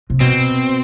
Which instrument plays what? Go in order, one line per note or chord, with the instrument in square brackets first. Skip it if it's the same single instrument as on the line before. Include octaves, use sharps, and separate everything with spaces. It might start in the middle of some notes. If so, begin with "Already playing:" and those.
[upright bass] C3
[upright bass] B2 [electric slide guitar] C4